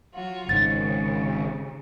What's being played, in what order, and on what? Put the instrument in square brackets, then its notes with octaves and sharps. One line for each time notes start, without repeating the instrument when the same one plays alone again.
[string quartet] F#3 F4 F#4
[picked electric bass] G#1 G#2 [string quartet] C#3 [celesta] A6